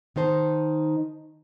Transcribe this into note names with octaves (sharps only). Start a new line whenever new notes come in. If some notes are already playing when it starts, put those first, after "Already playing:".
D#3 D#4 C5 A5